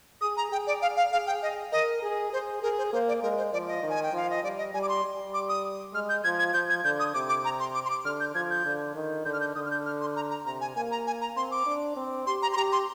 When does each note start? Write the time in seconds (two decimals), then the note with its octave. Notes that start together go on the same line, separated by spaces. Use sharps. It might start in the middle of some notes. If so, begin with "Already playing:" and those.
0.21 G#4 D#6
0.37 A#5
0.52 G#4 G5
0.67 D5
0.82 F5
0.97 F5
1.12 G#4 F5
1.27 G5
1.42 D#5
1.72 A#4 D#5
2.03 G#4
2.33 G#4 C5
2.62 G#4 A#4
2.78 C5
2.93 A#3 C5
3.08 D5
3.23 G#3 A#4
3.38 C5
3.53 F3 D5
3.68 D#5
3.83 D#3
3.89 G#5
4.03 G5
4.13 F3 F5
4.30 D#5
4.43 G3 D5
4.58 D#5
4.74 G3 G#5
4.82 D6
4.89 C6
5.04 G3
5.34 D6
5.49 D#6
5.94 G#3 F6
6.09 G6
6.24 F3 G#6
6.39 G#6
6.54 F3 G6
6.70 G#6
6.84 D3 G6
6.99 D#6
7.14 C3 D6
7.29 D6
7.45 A#5
7.59 C6
7.75 D6
7.85 C6
7.90 D6
8.05 D3 F6
8.20 G6
8.35 F3 G#6
8.50 G6
8.65 D3
8.95 D#3
9.25 D3 G6
9.33 F6
9.40 G6
9.55 D3 D#6
9.66 F6
9.71 G6
9.86 F6
10.01 C6
10.16 A#5
10.30 A#5
10.45 C3 A#5
10.61 G#5
10.76 A#3 G#5
10.91 A#5
11.07 G#5
11.21 A#5
11.36 C4 C6
11.51 D6
11.66 D4
11.96 C4
12.27 G4 C6
12.42 A#5
12.53 C6
12.57 G4 A#5
12.72 C6